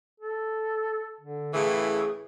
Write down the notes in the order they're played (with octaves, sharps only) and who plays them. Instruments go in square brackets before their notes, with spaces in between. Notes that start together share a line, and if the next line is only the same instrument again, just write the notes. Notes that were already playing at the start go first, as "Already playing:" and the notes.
[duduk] A4
D3
[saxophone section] A2 C#3 E3 [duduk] G#4